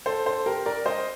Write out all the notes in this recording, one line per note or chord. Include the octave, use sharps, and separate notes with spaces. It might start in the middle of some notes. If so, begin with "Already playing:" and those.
A4 C5
A4 C5
G4 A#4
A#4 D5
C5 D#5